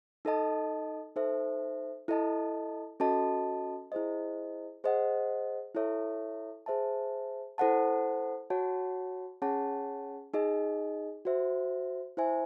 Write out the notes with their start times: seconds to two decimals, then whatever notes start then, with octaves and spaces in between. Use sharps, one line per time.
0.25 D#4 A4 D#5 A5
1.16 D#4 A4 C5 E5
2.08 E4 A4 D#5 A5
3.00 C#4 F#4 A4 D#5 A5
3.92 E4 G#4 C5 D#5
4.84 G#4 C5 D#5 F#5
5.75 E4 A4 C#5 E5
6.66 G#4 C5 E5 A5
7.58 E4 A4 C5 F#5 A5
8.50 F#4 C#5 F#5 A5
9.42 C#4 G#4 C#5 F#5 A5
10.34 D#4 G#4 D#5
11.25 F#4 C5 E5
12.17 E4 C5 E5 G#5